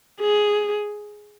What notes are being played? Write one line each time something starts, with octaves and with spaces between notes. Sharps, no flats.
G#4